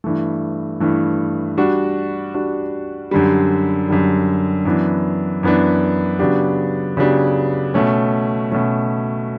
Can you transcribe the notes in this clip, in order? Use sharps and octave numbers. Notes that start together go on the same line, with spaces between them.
G2 E3 A3
G2 E3 A3
G3 D4 F#4
G3 D4 F#4
F#2 D3 G3
F#2 D3 G3
F#2 E3 B3 D4
F#2 E3 B3 D4
C#3 F#3 B3 D4 G4
C#3 F#3 B3 D4 G4
B2 A3 C#4
B2 A3 C#4